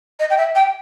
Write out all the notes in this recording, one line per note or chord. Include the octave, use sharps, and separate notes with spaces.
D#5
G5
E5
G5